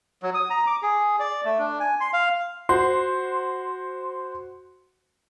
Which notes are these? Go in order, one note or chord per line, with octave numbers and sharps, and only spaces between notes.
F#3
D#6
A#5
D6
G#4
D5
A3
D4
G#5
C6
F5
F#4 C5 C6